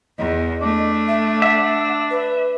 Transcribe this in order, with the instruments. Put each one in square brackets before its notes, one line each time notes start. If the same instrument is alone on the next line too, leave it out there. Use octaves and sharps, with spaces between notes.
[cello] E2 [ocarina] D#5
[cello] A3 [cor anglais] D4
[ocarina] E5
[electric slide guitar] E5 [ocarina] F#5
[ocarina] B4